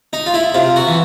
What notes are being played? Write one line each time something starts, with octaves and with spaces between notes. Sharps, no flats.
D#4
F4
E4
C3 F4
F#4
E3